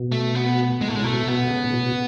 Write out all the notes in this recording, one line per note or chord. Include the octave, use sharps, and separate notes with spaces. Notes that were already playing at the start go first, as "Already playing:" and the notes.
Already playing: B2
A3
B3
A2 G#3
A3
C#3 G#3
B2 A3
B2 B3
C#3
A2
B2